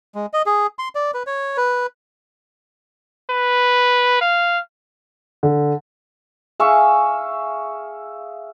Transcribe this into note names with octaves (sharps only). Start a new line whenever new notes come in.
G#3
D#5
G#4
C6
D5
B4
C#5
B4
B4
F5
D3
G#4 E5 F5 C#6